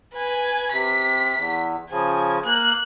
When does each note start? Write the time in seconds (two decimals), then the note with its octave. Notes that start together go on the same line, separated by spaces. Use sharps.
0.14 B4 G#5
0.71 C3 B6
1.35 E2
1.90 C#3 F3 G#5
2.46 A#3 F#6